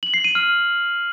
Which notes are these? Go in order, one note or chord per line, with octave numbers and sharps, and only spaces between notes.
F#7
C7
D#7
F6